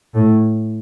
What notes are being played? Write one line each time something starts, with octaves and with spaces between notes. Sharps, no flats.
A2